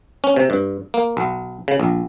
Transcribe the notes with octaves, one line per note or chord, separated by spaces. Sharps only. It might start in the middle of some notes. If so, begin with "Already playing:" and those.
C#4
C3
G2
A#3
B1
C#3
A#1